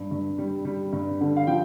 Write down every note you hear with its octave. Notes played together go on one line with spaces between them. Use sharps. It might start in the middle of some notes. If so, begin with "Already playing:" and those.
Already playing: G2
G2
G3
G3
G2
D3
F5
F3 G5